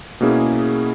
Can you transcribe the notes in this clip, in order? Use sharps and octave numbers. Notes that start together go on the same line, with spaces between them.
B2 A#3 C#4 E4 G#4